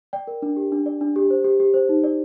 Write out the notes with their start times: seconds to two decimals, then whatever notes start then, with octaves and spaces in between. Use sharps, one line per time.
0.13 D5 G5
0.27 A#4
0.42 D4
0.57 G4
0.72 D4
0.86 D5
1.01 D4
1.16 G4
1.30 C5
1.44 G4
1.60 G4
1.74 C5
1.89 D#4
2.04 D5